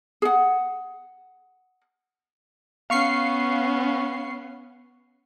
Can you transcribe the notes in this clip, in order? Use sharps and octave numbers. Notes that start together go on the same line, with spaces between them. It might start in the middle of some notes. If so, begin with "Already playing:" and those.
G#4 F#5
B3 C#4 F5 C#6 C7